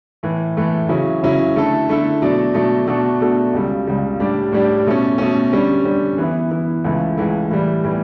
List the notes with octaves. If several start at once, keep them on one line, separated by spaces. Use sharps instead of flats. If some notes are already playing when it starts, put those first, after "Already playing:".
A2 E3 A3
A2 E3 A3
C#3 F#3 C#4 E4
C#3 F#3 C#4 E4
D3 A3 E4 A4
D3 A3 E4 A4
B2 F#3 A3 D4
B2 F#3 A3 D4
B2 A3 D4 F#4 A4
B2 A3 D4 F#4 A4
C#2 C#3 G3
C#2 C#3 G3
A2 G3 D4 G4
A2 G3 D4 G4
B2 A3 C#4
B2 A3 C#4
D3 G3 C#4
D3 G3 C#4
E3 B3 E4
E3 B3 E4
C#2 C#3 E3 A3 E4
C#2 C#3 E3 A3 E4
A2 E3 G3
A2 E3 G3